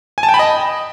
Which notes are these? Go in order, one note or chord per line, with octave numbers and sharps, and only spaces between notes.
G#5
A5
G5
B5
D#5